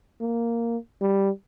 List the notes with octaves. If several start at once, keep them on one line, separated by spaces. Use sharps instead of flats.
A#3
G3